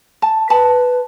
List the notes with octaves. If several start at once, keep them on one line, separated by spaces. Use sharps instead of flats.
A5
B4 A5 B5